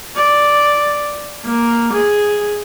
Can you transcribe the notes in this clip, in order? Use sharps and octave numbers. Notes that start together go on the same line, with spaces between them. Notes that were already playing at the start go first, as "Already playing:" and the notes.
D5
A#3
G#4